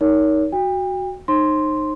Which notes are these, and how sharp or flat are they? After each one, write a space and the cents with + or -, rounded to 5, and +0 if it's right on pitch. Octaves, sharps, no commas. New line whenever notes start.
D#4 +10 A#4 +0 C#5 +30
F#4 +0 G5 +40
D#4 -20 C5 +40 C6 +0